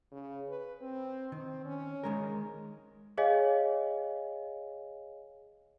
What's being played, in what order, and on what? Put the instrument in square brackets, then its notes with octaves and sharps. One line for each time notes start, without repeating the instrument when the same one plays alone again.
[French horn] C#3
B4
C4
[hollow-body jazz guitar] D#3 [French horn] C4
[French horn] C#4
[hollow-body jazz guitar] D#3 G#3 A#4
[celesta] G#4 C#5 D#5 F5 G#5